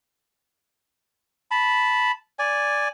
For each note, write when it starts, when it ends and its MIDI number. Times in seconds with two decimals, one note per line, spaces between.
1.51 2.11 81
1.51 2.11 83
2.39 2.88 74
2.39 2.88 80